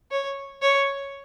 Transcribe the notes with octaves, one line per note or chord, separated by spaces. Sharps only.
C#5
C#5